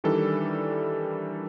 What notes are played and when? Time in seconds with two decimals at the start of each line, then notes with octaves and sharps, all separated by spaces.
0.04 D#3 E3 G3 D4 A4